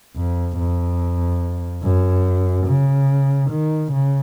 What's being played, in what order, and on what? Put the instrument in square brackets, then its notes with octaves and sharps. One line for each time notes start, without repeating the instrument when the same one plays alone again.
[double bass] F2
F2
F#2
C#3
D#3
C#3